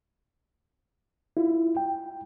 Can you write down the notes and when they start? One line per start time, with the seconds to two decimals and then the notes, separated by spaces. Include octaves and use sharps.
1.37 E4 F4
1.77 G5